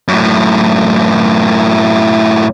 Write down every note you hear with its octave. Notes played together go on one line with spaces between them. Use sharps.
F#2 A2